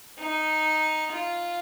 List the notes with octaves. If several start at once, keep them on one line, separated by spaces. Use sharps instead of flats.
D#4
F4